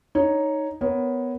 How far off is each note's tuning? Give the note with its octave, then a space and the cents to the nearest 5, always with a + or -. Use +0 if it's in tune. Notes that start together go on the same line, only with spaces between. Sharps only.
D#4 +0 C#5 +0
B3 +10 A#4 +20 C#5 +0